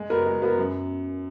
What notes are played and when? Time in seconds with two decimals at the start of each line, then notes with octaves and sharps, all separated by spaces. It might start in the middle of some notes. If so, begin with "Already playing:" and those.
Already playing: G#3
0.10 B3 F#4 A#4
0.26 G#3
0.42 B3 F#4 A#4
0.58 F#2